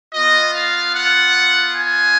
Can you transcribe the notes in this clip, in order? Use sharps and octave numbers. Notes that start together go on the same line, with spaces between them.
B3 F4 D#5
F5
F#5
G#5